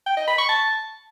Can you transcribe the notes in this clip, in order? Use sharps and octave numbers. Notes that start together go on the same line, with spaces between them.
G5
D#5
B5
C#6
A5